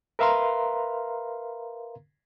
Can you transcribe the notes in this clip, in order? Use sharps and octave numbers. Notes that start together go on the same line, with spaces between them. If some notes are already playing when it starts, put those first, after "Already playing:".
A#4 B4 E5 F5 A#5 C6